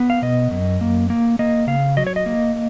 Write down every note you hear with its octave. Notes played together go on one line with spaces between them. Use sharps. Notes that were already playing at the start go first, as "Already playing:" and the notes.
Already playing: B3
F5
B2 D#5
F#2
A#3
A#3
A#3 D#5
C#3 F5
F#3 D#5
C#5
D#5
A#3